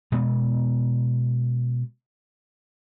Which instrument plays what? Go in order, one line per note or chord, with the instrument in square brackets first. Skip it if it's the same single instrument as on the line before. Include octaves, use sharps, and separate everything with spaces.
[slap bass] B2 G#3 B3